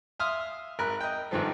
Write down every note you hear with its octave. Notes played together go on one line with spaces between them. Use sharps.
E5 F5 C6 D#6 F6
G#1 A#4 B5 F#6
D#5 G5
G#1 G2 D#3 F3 A4